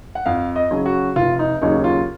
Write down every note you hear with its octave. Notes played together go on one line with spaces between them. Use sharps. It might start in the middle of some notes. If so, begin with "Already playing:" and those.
F#5
F2 F5
D#5
C#3 F#3
F#4
F1 F4
D#4
D#2 C#3 F#3 D#4
F4